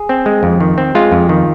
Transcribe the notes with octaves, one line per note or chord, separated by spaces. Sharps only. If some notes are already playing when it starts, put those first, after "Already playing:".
Already playing: G#4
C4
G#3
F2
D#3
C4
G#3 F4
F2
D#3